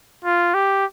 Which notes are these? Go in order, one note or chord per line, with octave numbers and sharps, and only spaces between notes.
F4
G4